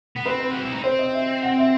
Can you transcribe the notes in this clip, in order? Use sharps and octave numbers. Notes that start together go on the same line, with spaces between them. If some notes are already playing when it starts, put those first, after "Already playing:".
B3
C4 B4
B4
F#4
E4
D#4
C4 C5
D#5
E5
F#5
E5